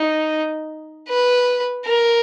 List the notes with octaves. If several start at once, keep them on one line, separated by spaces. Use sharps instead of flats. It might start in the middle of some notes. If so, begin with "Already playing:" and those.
Already playing: D#4
B4
A#4